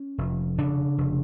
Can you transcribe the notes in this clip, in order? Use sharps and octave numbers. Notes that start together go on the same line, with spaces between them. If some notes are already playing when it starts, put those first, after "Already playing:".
Already playing: C#4
F1
C#3 D4
F1